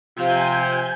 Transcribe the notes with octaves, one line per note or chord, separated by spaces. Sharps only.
C3 F3 F4 C5 F5 G#5 G6